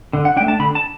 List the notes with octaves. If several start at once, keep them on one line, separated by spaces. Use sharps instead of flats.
D3
F#5
A3 D4 G5
A5
D3 B5
A5